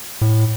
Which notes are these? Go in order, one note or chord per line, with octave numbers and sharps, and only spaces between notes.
A2